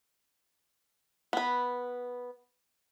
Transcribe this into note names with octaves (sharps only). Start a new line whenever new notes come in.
B3 B4